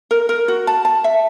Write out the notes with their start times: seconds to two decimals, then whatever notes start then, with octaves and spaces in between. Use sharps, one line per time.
0.11 A#4
0.29 A#4
0.48 F#4
0.67 A5
0.85 A5
1.04 E5